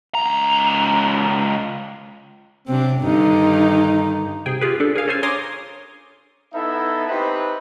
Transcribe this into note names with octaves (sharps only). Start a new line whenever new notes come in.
C#2 A#5
C3 F#3 C4 D4
G2 D3 D#3 D#4
C3 G#4 G5
F4 G4 G#4 B4
D4 A4
G#4 A#4 F5 G#5
C#4 A4 C5 G#5
C#5 G#5 A#5 C6 D6 D#6
B3 D#4 E4 A4 E5
C4 D#4 G4 B4 B5